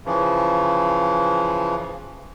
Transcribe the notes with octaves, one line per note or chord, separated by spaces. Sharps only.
C#3 E3 F3